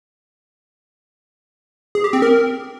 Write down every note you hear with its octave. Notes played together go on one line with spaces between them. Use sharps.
G#4
G4
C4
A#4